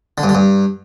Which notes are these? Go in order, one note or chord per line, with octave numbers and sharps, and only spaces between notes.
D3
G2
D3
G2